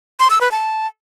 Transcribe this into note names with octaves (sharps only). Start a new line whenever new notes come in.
C6
E6
B4
A5